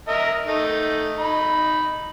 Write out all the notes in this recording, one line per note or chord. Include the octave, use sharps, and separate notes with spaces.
A#4 D#5 E5
A3 D#4
D#4 B5